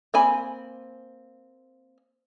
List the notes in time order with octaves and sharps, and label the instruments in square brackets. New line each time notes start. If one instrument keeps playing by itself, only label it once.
[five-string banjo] A#3 C4 G#5 B5